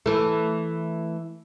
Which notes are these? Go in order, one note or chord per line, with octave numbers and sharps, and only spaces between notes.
E3 A3